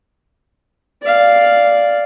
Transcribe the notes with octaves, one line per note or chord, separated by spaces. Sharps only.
D5 F5